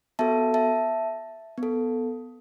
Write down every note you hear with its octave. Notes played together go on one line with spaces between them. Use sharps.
B3 F#4 A4 E5 A5
E5 A5
B3
A4